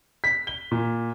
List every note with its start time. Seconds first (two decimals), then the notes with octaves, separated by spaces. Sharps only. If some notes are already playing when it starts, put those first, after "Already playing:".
0.24 B6
0.47 G7
0.71 A#2